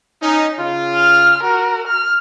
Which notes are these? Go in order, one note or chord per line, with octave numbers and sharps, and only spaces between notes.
C#4 D#4
C#3 F4
F6
F#4 A#4
F6